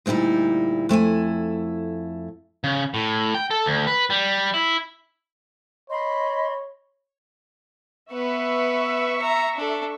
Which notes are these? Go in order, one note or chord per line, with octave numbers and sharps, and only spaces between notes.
D2 A#2 G3 D#4 E4
F2 A3 E4 G#5
C#3
A2
G5
A4
D2
B4
G3
E4
C#5 D#5 B5 C6
B3 B4 E5 C#6
A#5
D4 A4